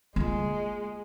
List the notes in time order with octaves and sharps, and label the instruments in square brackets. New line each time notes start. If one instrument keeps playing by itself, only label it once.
[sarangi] G#3 [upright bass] A#3 F4